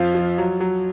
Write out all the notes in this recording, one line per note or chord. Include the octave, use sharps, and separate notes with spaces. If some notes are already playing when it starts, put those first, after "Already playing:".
Already playing: F2 F3 F5
F3
F#3
F#3